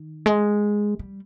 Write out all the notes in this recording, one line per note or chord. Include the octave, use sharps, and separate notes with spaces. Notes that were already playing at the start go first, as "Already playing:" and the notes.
Already playing: D#3
G#3
G3